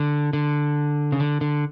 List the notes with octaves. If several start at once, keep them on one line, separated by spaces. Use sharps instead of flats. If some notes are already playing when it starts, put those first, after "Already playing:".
Already playing: D3
D3
C#3
D3
D3